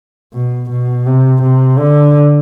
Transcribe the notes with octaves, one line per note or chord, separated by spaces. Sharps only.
B2
B2
C3
C3
D3